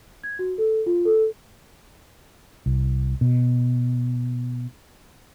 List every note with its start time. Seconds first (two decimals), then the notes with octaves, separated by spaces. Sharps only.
0.24 G#6
0.39 F#4
0.58 A4
0.86 F4
1.05 A4
2.66 C2
3.21 B2